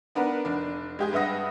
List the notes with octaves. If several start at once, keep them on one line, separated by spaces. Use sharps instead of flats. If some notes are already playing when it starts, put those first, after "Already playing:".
B3 D4 A#4 B4
F1 D4
G#3 G4 G#4
G2 B4 E5 F#5 D#6 A#6